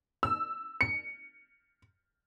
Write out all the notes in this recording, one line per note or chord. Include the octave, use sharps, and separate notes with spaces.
E6
C#7